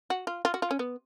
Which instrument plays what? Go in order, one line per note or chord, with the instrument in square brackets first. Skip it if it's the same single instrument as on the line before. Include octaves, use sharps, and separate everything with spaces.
[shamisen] F#4
F4
F4
F#4
F4
C#4
B3